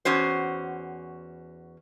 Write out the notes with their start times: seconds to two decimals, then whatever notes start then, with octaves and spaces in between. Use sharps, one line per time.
0.05 E2 C#4 F#4 C5